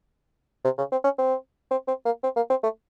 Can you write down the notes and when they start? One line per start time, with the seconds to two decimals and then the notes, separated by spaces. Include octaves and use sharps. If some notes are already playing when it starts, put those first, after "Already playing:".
0.65 C3
0.78 C#3
0.92 C4
1.04 C#4
1.18 C4
1.71 C4
1.88 C4
2.05 A#3
2.23 C4
2.36 A#3
2.50 C4
2.63 A3